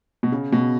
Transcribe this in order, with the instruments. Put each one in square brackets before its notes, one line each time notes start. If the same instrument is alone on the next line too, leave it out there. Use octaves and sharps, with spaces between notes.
[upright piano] B2
C#3
B2